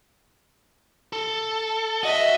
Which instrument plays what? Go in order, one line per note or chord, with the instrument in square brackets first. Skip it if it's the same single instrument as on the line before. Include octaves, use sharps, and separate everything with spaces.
[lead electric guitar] A4
[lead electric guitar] F#4 F#5 [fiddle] D#5 E5